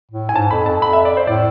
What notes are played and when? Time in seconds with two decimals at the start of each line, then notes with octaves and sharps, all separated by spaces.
0.12 A2
0.29 G#5
0.35 G#2 A5
0.51 F2 B5
0.66 F2 A5
0.82 B5
0.93 E5
1.05 D5
1.17 C5
1.27 A2 D5